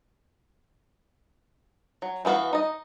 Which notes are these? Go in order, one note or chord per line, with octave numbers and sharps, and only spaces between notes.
F#3
E3 G#3 B3 F#4 F5
D#4 D#5